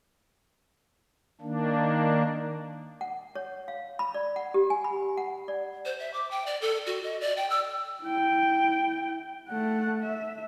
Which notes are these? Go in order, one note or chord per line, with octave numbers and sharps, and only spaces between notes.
D#3 A#3 D4
F#5
C#5
F5
B5
D5
F#5
G4
G#5
B5
F#5
D5
C5
E5
D6
G5
D5
A4
F#4
D#5
D5
G5
E6
E4 G5
A3 F#5
E5